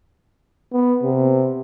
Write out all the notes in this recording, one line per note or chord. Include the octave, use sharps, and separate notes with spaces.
B3
C3